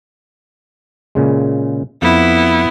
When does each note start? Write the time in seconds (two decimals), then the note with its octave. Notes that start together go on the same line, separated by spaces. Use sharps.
1.15 A#2 C#3 G#3
2.02 F2 B3 E4 F5